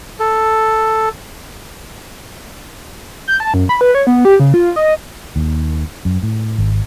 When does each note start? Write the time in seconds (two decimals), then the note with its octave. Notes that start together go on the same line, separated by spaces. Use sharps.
0.20 A4
3.28 G6
3.40 A5
3.54 F#2
3.69 B5
3.81 B4
3.95 C#5
4.07 B3
4.25 G4
4.40 C#3
4.54 F4
4.76 D#5
5.36 D#2
6.05 F#2
6.23 A2
6.58 G#1